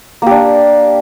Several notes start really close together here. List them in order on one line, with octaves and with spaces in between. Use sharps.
A#3 G4 D4